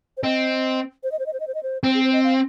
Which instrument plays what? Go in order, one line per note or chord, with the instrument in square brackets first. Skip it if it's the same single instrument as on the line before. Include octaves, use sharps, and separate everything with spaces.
[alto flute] C5
[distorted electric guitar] C4 [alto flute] D#5
[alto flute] C5
D#5
C5
D#5
C5
D#5
C5
D#5
C5
[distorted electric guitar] C4 [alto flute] C5
[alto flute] G#4
C5
D#5
F5